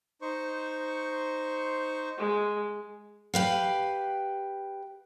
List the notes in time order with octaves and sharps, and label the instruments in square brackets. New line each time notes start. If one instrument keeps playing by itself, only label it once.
[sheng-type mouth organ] D#4 C5 C#6
[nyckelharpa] G#3
[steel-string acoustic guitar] G4 B4 F5